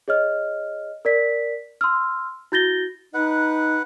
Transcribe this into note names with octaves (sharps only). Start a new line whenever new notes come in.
G#4 C#5 D#5 F6
A#4 D5 B6
C6 E6 F6
E4 F#4 G6 A6 A#6 G7
D#4 B4 F#5